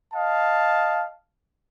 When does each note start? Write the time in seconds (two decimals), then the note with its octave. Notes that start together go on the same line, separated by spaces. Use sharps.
0.13 D#5 F5 A5